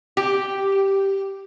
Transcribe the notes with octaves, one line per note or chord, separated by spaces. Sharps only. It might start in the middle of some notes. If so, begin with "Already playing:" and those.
G4